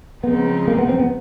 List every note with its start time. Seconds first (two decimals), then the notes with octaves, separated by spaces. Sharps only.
0.23 C#3 F3 G#3 B3 C4 D#4
0.67 A#3
0.78 B3
0.89 C4
0.99 B3